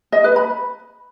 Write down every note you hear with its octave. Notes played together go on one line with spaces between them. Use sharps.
D#5
B4
B5